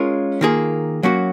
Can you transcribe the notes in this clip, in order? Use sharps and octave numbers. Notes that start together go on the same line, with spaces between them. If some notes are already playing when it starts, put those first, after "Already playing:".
Already playing: G#3 C#4 F4 A#4
D#3 A#3 F4 G#4
F#3 A#3 C#4 F#4